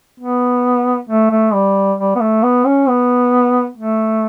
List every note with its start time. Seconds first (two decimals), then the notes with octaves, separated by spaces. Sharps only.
0.20 B3
1.09 A3
1.31 A3
1.53 G3
1.99 G3
2.16 B3
2.21 A3
2.43 B3
2.66 C#4
2.89 B3
3.77 A3